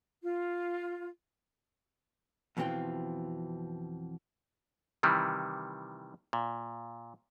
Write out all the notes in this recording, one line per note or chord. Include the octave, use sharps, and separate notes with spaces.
F4
F2 B2 E3 C4 F4 G5
C3 D#3 E3 G3
A#2